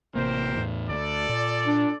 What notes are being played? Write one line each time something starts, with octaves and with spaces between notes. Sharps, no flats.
A1 C3 A#3 G4 A#4 C5
E2 A2
D2 A4 D5
A#2
D4